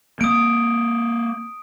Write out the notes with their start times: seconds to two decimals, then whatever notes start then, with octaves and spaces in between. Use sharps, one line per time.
0.21 A#3 C4 D#6 D7